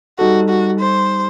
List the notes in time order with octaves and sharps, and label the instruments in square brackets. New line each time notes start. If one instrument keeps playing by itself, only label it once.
[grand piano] G3 D#4 A4 [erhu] F#4
[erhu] F#4
C5